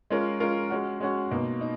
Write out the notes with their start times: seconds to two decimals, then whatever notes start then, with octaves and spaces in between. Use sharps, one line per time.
0.10 G#3 C#4 F4 A#4
0.40 G#3 C#4 F4 A#4
0.70 G#3 C#4 F#4
1.00 G#3 C#4 F#4
1.31 B2 A#3 D#4
1.61 D#4